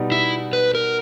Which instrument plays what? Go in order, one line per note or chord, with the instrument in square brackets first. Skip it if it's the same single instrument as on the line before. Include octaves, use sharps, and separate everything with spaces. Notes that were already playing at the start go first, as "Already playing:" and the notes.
Already playing: [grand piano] B2 G3 B3 D#4
[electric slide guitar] E4
B4
A#4